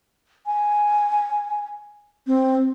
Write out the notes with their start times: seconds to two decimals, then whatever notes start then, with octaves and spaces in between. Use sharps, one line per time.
0.46 G#5
2.27 C4